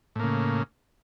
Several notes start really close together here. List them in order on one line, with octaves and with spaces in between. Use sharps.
A2 A#3 C#3